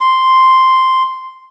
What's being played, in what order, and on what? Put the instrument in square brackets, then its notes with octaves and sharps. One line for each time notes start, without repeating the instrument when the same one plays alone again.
[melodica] C6